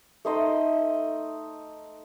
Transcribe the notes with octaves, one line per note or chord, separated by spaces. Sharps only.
A3 D#4 C5 D#5